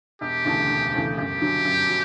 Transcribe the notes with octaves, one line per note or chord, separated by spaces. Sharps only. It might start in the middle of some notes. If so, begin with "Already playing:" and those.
E1 G4
D2 C#3 E3 A3
E1
D2 C#3 E3 A3
F#2 G4
D3 F#3
F#2
F#3